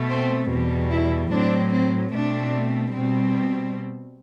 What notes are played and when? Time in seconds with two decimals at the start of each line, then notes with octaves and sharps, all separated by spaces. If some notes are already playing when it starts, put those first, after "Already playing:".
Already playing: B2 A3
0.10 C4
0.51 E2 B2 G3
0.91 E4
1.31 A2 F#3 C4 D4
1.72 C4
2.13 B2 A3 C4 D4
2.94 B2 G3 C4